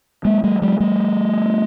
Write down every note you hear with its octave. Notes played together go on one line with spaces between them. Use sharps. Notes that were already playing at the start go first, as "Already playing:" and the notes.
G#3 A#3
G3 A3
F#3 G#3
G3 A3